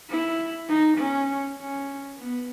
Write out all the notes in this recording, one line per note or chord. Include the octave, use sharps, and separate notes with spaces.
E4
D#4
C#4
C#4
B3